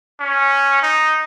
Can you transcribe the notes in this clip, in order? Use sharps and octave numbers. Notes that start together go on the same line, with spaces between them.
C#4
D#4